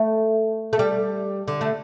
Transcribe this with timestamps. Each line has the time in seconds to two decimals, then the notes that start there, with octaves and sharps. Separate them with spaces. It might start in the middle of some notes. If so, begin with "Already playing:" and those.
Already playing: A3
0.73 A3
0.79 G3
1.48 D3
1.61 A3